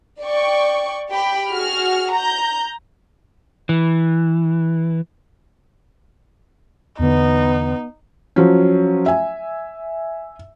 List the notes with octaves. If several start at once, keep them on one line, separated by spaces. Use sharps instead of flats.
D5 G5 C#6
G4 G5 B5
F#4 G#4 F6
A#5 G6
E3
E2 D3 B3 D#4
F3 F#3 C#4
E5 G#5